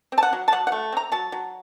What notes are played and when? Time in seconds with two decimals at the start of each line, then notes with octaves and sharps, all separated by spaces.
0.12 C4
0.18 A5
0.23 F#5
0.33 F#3
0.48 A5
0.52 F#3 F#5
0.67 F#5
0.72 A3
0.92 C4 A#5
1.12 F#3 A5
1.32 F#3